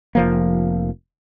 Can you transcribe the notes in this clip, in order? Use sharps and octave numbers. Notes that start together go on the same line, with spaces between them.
F1 F3 A#3